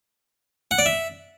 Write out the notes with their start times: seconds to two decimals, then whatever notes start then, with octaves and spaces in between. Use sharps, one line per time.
0.71 F#5
0.78 D5
0.86 E5